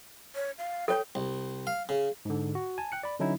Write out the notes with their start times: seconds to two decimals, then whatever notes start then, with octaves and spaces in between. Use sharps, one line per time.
0.35 C#5
0.58 F5
0.88 A4 C#5 G5
1.15 C2
1.67 F5
1.89 C#3
2.25 G#2 D3
2.55 F#4
2.78 G#5 A5
2.92 G5 F#6 C#7
3.03 D5 B5
3.19 D3 F#3 C#4 D#4 E4